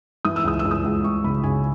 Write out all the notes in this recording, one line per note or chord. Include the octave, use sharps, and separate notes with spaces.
E3 D#6
E6
C#2 D#6
E6
C#2
D#6
C#2
C#2 C#6
C#3 B5
C#3 G#5